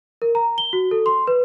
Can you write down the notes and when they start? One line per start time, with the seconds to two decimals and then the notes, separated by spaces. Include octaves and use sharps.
0.22 A#4
0.35 A#5
0.58 G7
0.73 F#4
0.91 A4
1.06 C6
1.27 B4